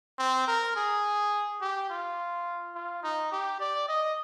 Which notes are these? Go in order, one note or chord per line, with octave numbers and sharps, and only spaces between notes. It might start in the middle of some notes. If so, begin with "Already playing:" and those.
C4
A#4
G#4
G4
F4
F4
D#4
G4
D5
D#5